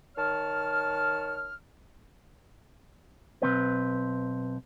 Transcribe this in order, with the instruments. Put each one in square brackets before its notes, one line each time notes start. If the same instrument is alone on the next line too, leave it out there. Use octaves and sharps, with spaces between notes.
[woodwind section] D#3 C#5 A5 F6
[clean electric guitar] B1 B2 C4 B4